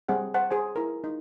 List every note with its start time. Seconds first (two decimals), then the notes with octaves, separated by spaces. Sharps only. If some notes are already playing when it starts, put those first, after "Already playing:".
0.08 G3 C4 G#4 F#5
0.34 C5 F#5 A5
0.50 G#4 C5 G#5
0.76 E4 A#4
1.04 D#4